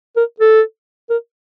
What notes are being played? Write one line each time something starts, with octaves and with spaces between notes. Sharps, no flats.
A#4
A4
A#4